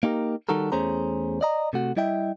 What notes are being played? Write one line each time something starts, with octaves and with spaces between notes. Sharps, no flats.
A#3 D#4 G4 A#4
D#3 G3 D#4 F#4 A4 A#4
E2 A3 C#4 G#4 C5 A#5
D5 D#5 A#5
C3 A3 F#4
G3 E4 D#5 E5 G5